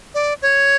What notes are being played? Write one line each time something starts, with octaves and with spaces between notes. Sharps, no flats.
D5
C#5